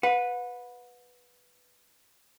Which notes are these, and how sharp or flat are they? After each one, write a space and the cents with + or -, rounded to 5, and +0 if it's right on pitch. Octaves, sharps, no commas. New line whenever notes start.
B4 +0 F#5 -35